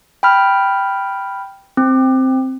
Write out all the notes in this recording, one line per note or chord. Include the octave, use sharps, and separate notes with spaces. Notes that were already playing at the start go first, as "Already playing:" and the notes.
G5 B5 F6
C4